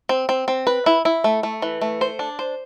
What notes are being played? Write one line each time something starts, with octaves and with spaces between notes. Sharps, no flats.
C4
C4
C4
B4
E4
E4
A3
A3
E3
A3
C5
D4
C5